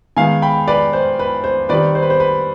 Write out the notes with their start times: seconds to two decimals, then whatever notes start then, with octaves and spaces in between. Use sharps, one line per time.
0.17 D#3 G#3 B3 F5 G#5
0.42 G5 B5
0.68 B4 D5
0.93 C5
1.19 B4
1.44 C5
1.69 D#3 G3 C4 B4 D5
1.95 C5
2.02 B4
2.10 C5
2.20 B4